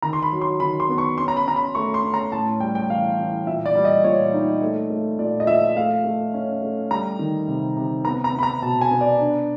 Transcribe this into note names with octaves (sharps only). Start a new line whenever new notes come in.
D#3 A#5
C6
B5
F#3
C6
D#3 B5
C6
B3
C#6
C#4 C6
A#5
B5
C#4 A#5
B5
A3 C#6
C6
C#4
A#5
A2 A5
G3 G5
G5
E3 F5
E3
A#2 E5
D5
G3
D#5
A#2 C#5
D#4
A3
A3
A#2 D5
D#5
F3 E5
A3 F5
A3
C#4
A3
G3 A#5
D#3
C3
C3
B3 A#5
A#5
B3
B5
A#5
B2 A5
G#5
B3
D5
D4